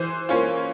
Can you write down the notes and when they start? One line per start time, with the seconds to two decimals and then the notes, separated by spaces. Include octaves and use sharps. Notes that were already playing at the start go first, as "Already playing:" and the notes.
Already playing: E3 C5
0.29 A#3 C#4 F4